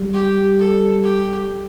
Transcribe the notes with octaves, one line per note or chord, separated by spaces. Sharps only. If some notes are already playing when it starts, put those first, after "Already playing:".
Already playing: G3
G4
A4
G4